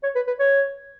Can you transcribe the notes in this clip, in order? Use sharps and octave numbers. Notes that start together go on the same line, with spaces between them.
C#5
B4
B4
C#5